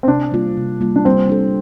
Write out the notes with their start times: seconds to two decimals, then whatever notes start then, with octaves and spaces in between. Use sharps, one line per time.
0.03 C4
0.07 C3 D4
0.32 G3 A#3 F4
0.57 C3
0.81 G3 A#3 F4
0.96 D4
1.05 G3 C4
1.29 D4 A4